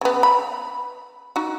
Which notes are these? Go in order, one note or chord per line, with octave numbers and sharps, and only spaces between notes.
C#3 B3
B5
D#4 F#4